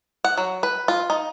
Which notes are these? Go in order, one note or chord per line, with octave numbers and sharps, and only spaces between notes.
F#5
F#3
B4
F4
D#4